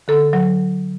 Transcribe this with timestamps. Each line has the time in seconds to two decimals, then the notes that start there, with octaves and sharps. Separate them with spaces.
0.08 D3 A4
0.33 F#3